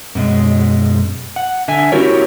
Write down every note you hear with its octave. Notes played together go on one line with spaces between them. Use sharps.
F#2 B2 G#3
F#5
D3 E5 G#5
C#4 E4 F#4 G4 A#4 C#5